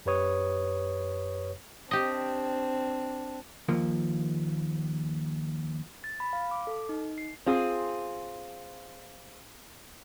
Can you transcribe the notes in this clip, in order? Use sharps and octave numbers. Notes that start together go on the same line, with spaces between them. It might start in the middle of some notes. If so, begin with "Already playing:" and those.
F#2 G4 B4 C#5 D#6
C4 D4 G4 D#5
D#2 F3 A#3
A6
B5
F5
D6
A4
D#4
C7
C4 F4 G#4